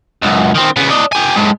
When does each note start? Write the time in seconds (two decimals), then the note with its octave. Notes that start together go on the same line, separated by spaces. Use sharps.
0.23 C#2 F#2
0.55 D#3 C4
0.76 C#3 B3
0.90 D4 D#5
1.12 G4 G#5
1.36 A2 G#3